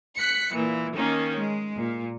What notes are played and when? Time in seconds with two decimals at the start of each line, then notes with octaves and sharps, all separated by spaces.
0.17 F#6 B6 C#7
0.54 A#2 E3
0.95 D#3 A#3 C#4 D#4
1.37 G#3
1.78 A#2